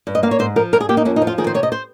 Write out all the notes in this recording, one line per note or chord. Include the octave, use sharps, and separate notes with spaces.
G2
D#5
A#3 F5
C#5
G#2 C5
F3 A#4
G2 A#4
G#4
A#3 G4
D#4
F2 C#4
D#4
F3
F4
D#3 G#4
C5
C3 C#5
D#5
C5